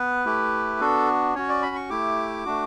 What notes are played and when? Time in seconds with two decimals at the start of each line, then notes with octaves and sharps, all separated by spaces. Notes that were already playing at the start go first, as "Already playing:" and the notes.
Already playing: B3 B4
0.25 A3 E4 G4
0.80 B3 D4 F#4 A4
1.35 C#4 F#4 C#5
1.49 D5
1.62 B5
1.76 C#6
1.89 A3 E4 G4 D6
2.45 A3 D4 F#4